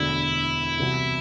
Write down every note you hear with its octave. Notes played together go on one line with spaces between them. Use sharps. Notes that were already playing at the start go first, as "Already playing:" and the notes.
Already playing: E1 D2 D3 E4
C2 C3 E3 B3 F#4